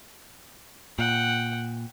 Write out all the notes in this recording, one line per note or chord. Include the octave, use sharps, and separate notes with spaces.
A#2 F#5 G5